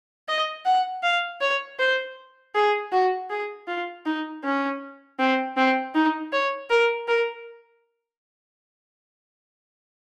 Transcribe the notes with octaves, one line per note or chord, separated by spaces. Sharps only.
D#5
F#5
F5
C#5
C5
G#4
F#4
G#4
F4
D#4
C#4
C4
C4
D#4
C#5
A#4
A#4